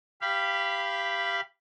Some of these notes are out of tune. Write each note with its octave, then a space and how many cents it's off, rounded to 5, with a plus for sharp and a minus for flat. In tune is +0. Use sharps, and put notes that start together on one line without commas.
G4 +0 F5 -25 B5 +0